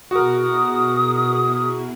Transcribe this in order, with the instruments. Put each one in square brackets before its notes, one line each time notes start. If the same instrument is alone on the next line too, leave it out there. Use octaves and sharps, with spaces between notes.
[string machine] B2 E4 G#4 [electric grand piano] F#4 A#4 [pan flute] D#6